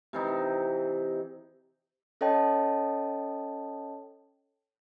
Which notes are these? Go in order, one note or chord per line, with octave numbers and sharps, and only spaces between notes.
C3 E3 D#4
C#4 A4 C#5 D#5 G5 A5